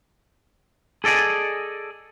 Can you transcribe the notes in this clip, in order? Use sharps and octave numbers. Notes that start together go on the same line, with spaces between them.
G#4 A4 D5 D#5 G#5